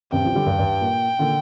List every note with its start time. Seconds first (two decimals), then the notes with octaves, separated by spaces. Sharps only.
0.12 G2 C3 G5
0.24 C3 F3
0.35 D3 G3
0.46 G2
0.59 G2
0.81 A#2
1.19 A#2 D3